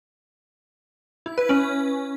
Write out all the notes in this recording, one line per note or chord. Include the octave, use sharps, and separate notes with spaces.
E4
B4
C#4